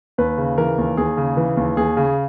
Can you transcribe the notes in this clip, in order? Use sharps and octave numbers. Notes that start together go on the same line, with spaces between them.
D#2 B4
C#3
E3 A#4
D#2
D#2 G#4
C#3
E3
D#2
D#2 G#4
C#3